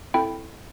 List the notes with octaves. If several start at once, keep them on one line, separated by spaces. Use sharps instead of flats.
C4 E4 A4 G5 B5